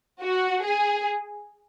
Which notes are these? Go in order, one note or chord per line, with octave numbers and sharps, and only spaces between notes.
F#4
G#4